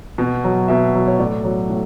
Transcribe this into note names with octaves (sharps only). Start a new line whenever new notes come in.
B2
F#3
B2 E5
F#3
C#5
A2 D5
F#3
A2